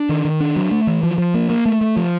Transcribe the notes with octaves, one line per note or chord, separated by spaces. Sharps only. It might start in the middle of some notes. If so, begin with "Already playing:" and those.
Already playing: D4
D#3
D#3
D4
F#3
A3
E3
F3
F3
A#3
A#3
A3
A3
F3